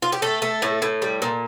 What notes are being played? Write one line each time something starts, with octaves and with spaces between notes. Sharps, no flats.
F4
G4
A3 A4
A3
A2
A2
G3
A#2